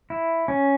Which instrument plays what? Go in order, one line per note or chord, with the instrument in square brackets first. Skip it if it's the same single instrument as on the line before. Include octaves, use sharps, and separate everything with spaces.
[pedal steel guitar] E4
C#4